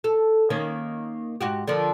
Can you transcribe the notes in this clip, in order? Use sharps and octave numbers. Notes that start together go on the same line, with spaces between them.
A4
D#3 A#3 C#4
G#2 F#4 G4
D3 F3 A#4